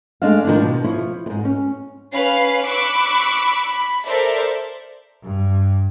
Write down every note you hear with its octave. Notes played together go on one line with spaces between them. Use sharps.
G#3 A3 D4 D#5 F5
D#3 F3 D4
B2
F3 E4 C#5
F2 G#2
C#4
C#4 B4 F5 B5 C7
B5 C#6 D6 E6 F#6
B5
A4 A#4 C5 D5 E5
G2